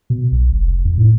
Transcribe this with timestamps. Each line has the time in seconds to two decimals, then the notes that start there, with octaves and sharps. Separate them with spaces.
0.10 B2
0.32 B1
0.52 F1
0.85 F2
0.98 A2